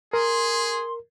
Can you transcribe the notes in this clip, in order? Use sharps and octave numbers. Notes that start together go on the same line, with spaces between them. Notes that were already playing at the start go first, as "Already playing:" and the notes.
G#4 A#4 C6